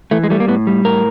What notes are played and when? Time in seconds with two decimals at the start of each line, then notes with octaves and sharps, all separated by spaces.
0.11 E3 A3
0.24 G#3
0.30 G3 A3
0.40 A#3
0.48 A2 B3
0.67 G3
0.85 A2 A#4